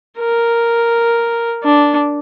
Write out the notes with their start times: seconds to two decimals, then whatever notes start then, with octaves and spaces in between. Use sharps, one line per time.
0.18 A#4
1.63 D4